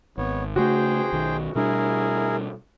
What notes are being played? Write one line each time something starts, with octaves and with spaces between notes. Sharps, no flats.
G#1 B3 C#5
C#3 A3 F#4 G#4 C5 G5
B1 D#3
B2 G3 D4 E4 G#4 A#4